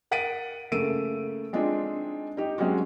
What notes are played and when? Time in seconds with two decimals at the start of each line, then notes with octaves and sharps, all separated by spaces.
0.11 A#4 F#5 A6 B6 D7 D#7
0.72 C#3 A3 A#3 E6 D7 D#7
1.53 G#3 C4 D4 D#4 F4
2.37 D#4 G4
2.58 F#3 G#3 C4 C#4 F#4